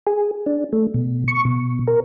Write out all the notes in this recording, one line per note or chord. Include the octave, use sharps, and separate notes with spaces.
G#4
D4
A3
B2
C#6
B2
A#4